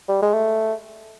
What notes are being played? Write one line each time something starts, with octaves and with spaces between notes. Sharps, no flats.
G3
G#3
A3